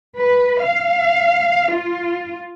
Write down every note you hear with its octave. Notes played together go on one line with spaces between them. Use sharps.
B4
F5
F4